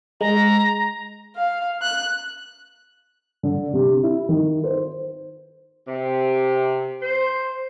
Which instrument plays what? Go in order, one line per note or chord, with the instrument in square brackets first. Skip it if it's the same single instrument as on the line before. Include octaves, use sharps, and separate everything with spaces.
[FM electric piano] G#3 [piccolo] A#5
[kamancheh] F5
F#6
[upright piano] D3
C3
E4
D#3
C5
[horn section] C3
C5